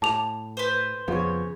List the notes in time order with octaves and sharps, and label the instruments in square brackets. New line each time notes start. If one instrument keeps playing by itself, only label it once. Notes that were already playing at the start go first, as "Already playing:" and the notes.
[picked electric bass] A2 [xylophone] A5 D6 F7
[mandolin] B4 C5
[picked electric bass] F2 F3 B3 [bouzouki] C#3 C#5